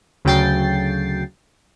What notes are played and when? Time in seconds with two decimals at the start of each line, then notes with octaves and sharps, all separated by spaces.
0.25 D2 C#3 F#3 G5 A6 C7